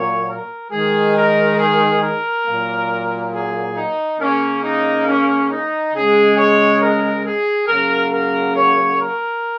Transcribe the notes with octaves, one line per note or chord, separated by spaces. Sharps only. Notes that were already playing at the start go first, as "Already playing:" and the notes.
Already playing: A#2 F#3 A#3 C#5
A#4
D#3 G#3 G#4
A#4
G#4
A#4
A#2 F#3 A#3
G#4
D#4
C#3 A#3 C#4
D#4
C#4
D#4
C#3 G#3 G#4
C#5
A#4
G#4
C#3 F#3 A#3 A#4
A#4
C#5
A#4